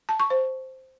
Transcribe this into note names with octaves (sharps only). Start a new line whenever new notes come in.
A5
C#6
C5